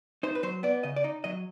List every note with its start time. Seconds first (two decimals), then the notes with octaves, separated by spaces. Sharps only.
0.23 D#4 C5
0.35 B4
0.43 F#3 C5
0.63 B3 D5
0.83 C#3 D#5
0.96 D5
1.04 D#4 D#5
1.24 F#3 D#5